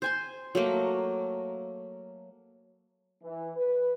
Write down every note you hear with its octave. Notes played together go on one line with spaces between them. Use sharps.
C5 G#5 C6
F#3 A3 A#3
E3
B4